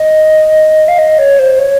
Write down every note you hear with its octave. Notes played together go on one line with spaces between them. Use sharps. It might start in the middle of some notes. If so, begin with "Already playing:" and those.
Already playing: D#5
F5
D#5
C#5
C5
C#5